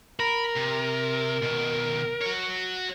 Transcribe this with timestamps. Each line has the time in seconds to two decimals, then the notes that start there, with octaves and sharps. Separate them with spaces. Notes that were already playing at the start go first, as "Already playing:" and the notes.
0.20 A#4 B5
0.56 C3
1.43 B2 D#3
2.22 F#4 C#5